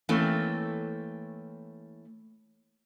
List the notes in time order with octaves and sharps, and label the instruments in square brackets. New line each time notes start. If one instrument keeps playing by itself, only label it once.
[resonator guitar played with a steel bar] E3 A3 A#3 C4 C#4